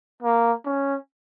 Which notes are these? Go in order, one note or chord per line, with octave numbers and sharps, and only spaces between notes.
A#3
C#4